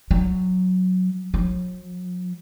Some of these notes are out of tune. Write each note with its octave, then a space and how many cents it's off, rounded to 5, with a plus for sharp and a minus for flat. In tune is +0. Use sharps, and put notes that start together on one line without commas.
F#3 -5
F#3 -45